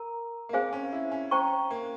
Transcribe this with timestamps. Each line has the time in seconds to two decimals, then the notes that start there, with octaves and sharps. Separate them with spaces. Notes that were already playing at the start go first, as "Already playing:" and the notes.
Already playing: A#4 A#5
0.49 A#3
0.53 C4 G#4 C5 F5 G#5
0.73 C#4
0.92 E4
1.12 C#4
1.31 C5 G5 A#5 C#6
1.71 A#3